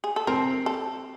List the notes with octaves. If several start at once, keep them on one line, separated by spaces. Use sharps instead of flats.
G#4
A4
C4 A#4
A4